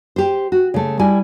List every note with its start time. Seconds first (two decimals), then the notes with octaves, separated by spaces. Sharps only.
0.16 G4 C5
0.52 F#4
0.74 C#3 A3
0.99 G3 E4 G#5